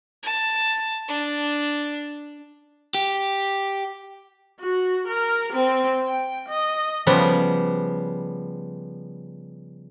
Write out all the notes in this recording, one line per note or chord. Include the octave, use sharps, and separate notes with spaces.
A5
D4
G4
F#4
A#4
C4
G5
D#5
C#3 F3 G3 B3